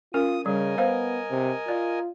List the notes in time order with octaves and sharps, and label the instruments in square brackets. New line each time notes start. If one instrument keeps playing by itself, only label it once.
[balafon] C#4 A#4 [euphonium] F4 [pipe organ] D#6
[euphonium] C#3 [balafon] G3 [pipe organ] A#4 D#5 G#5
[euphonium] B3 [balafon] C5 F5
[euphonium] C3
[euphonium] F4 [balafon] D5